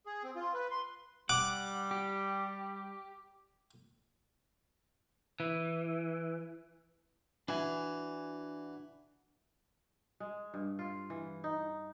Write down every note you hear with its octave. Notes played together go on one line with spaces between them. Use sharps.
G#4
C4
F4
B4
C6
G3 F#5 D6
G4
E3
E3 D4 F#4 G#5
G#3
G2
F4
E3
D#4